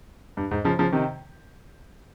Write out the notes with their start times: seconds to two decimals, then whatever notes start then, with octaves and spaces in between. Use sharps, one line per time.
0.37 G2
0.51 G#2
0.64 C#3 F3
0.79 C#3 F3
0.92 C3 D#3